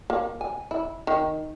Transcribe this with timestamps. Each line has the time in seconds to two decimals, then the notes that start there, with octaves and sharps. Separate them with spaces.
0.10 A#3
0.41 G#5
0.71 E4
1.07 D#3